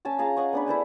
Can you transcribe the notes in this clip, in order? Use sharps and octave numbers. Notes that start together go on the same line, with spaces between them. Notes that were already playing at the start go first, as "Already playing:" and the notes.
C#4 G#5 A5 E6
F4 G#4 F5 A#5
C#5 D#5 F#5 C#6
B3 D4 B4
E4 A4 C5 G#5